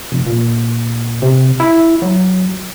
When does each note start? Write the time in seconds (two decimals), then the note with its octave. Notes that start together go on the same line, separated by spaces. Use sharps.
0.12 F1
0.27 A#2
1.22 C3
1.60 E4
2.02 F#3